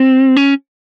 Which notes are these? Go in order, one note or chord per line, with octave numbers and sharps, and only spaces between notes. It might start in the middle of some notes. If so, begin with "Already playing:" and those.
Already playing: C4
C#4